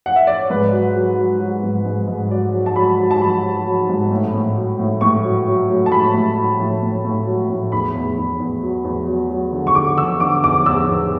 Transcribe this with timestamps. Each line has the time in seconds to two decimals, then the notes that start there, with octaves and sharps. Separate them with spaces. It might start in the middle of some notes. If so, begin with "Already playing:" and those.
0.06 F#5
0.16 E5
0.27 D5
0.39 C#5
0.50 G#2 B4
0.72 F#3
0.96 F#3
1.17 F#3
1.41 F#3
1.63 G#2
1.85 G#2
2.08 G#2
2.31 F#3 D5
2.53 F#3
2.66 A5
2.76 F#3 B5
2.98 F#3
3.11 A5
3.21 F#3 B5
3.43 F#3
3.66 F#3
3.89 G#2
4.11 A2
4.34 A2
4.57 F#3
4.79 A2
5.01 A2 C#6
5.25 F#3
5.46 F#3
5.69 F#3
5.86 A5
5.92 A2 B5
6.14 A2
6.37 F#3
6.60 A2
6.83 A2
7.05 A2
7.27 F#3
7.49 A2
7.72 E2 B5
7.95 E2
8.18 E2
8.39 E2
8.63 F#3
8.85 E2
9.08 F#3
9.30 F#3
9.53 D3
9.67 C#6
9.75 D3 D6
9.98 D3 E6
10.20 D3 D6
10.43 E2 D6
10.65 E2 E6
10.89 E2